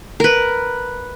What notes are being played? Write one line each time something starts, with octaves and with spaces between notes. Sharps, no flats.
A#4 B4